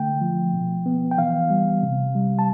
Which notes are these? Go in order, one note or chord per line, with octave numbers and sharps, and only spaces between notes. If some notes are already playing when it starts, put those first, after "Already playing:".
Already playing: D3 A3 G5
F3
B2
B3
G5
E3 F5
G3
C3
G3
A5